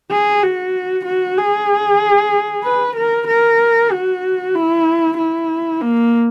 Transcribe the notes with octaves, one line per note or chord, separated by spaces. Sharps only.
G#4
F#4
F#4
G#4
B4
A#4
A#4
F#4
E4
E4
A#3